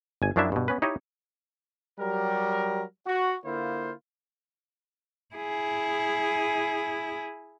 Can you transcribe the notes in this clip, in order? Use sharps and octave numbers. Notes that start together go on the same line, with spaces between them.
G1 G#5
F#2 F3 F#3 D4 E4 E5
G2 B2
B3 C#4 B4
D#4 E4 G4 C#5 D#5
F#3 G3 G4 A#4
F#4
D3 A#3 E4 F4 C5
E4 G#4